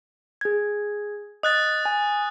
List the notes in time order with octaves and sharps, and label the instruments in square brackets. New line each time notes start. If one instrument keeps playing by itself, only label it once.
[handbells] G#4 G#6
[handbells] D#5 [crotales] D#6 F#6 A6
[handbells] G#5